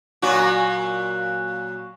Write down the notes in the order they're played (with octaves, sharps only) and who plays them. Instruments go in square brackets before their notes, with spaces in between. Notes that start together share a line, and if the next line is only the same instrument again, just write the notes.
[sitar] A#2 F#3 F#4